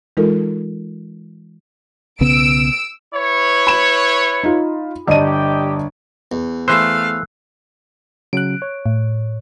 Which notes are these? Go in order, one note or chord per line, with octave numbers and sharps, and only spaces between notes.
E3 G#3 D#4 F4 A4 A#4
B1 C#3 B3 E6 D7
E4 B4 C#5
B5 E7
D#4 F4
G1 G4 D5 D#5 A5 D#7
E2
E3 A3 C5 F5 E6 F#6
C#3 F#3 C#4 F#6 D7
C#5
A2